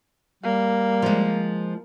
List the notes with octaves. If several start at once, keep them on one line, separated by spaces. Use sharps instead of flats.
G3 A#3
F3 G#3